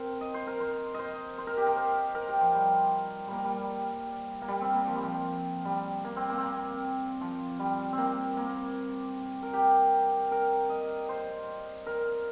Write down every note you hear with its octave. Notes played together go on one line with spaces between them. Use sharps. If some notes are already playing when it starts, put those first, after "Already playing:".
Already playing: C4 A#4 C5
D#5
C5
A#4
C5
C5 D#5
C5
A#4
G4
A#4
C5
A#4
G4
F3
G3
G3 A#3
G3
A#3
G3
C4
A#3
F3
G3
F3
G3
A#3
C4
A#3
C4
A#3
F3
G3
C4
A#3
A#3
A#4
G4
A#4
D#5
C5
A#4